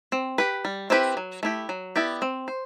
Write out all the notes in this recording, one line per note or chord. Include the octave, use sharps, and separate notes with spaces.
C4
G4 B4
G3
C4 E4 G4 B4
F#3
A3 E4 G4
F#3
B3 E4 G4 D5
C4
C5